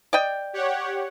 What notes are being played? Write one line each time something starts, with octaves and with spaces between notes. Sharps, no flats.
D5 D#5 G5
G4 C#5 F#5